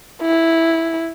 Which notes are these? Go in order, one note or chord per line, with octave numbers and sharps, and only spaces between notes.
E4